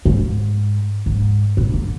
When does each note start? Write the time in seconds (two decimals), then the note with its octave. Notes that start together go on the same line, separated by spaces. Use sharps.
0.05 G#2
1.06 G#2
1.57 A#2
1.74 D3